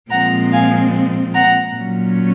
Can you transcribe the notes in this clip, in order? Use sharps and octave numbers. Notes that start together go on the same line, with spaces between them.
A#2 F3 G#3 C4 F#5 A#5
F5 G#5
F#5 A#5
A#2 F#3 C#4